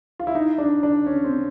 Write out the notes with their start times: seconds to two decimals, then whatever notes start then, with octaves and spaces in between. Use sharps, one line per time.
0.19 F4
0.27 E4
0.35 D#4
0.58 D4
0.83 D4
1.06 C#4
1.24 C4